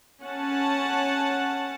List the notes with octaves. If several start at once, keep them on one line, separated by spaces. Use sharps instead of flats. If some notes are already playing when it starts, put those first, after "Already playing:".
C#4 F#5 A5